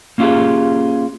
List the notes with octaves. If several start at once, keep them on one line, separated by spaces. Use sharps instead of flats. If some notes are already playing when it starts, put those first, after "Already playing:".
A#3 C#4 F4 G4 G#4